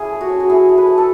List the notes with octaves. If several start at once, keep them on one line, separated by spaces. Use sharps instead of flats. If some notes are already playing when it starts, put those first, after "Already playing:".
Already playing: C#4 E4 G#4
A3
F#4
C#4
F#4
E4 G#4
A3
B4
A3
A4